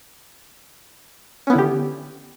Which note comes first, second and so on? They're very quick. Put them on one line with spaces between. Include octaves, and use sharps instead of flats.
C#4 B3 E4 D3 G4